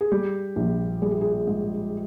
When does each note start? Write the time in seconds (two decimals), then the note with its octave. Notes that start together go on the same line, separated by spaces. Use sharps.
0.01 G#4
0.11 G3 G4
0.56 A#1
1.02 G3 G#4
1.11 G4
1.21 G#4
1.47 G#2